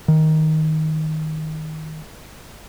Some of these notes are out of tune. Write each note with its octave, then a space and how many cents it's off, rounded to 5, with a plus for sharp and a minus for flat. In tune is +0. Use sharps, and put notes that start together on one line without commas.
D#3 +10